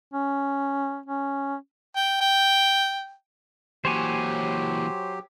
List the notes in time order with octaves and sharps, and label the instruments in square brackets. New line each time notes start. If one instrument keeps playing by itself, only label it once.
[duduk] C#4
C#4
[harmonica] G5
G5
[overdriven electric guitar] A#2 E3 [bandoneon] F#3 G4 [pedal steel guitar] C5 C#5 G#5